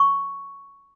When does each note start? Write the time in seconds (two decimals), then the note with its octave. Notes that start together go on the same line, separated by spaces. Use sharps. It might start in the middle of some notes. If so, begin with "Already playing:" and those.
Already playing: C#6